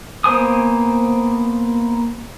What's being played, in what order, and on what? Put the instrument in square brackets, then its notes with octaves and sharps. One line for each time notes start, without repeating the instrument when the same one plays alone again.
[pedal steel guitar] A#3 B3 C5 G#5 D#6